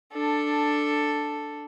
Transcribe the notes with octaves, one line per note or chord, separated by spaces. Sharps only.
D4 A4